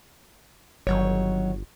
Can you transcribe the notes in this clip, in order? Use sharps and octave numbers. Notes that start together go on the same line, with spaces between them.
G1 D#3 F#3 C#5